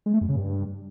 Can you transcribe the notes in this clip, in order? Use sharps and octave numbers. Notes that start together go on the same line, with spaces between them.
G#3
A3
F#2
C#3
G2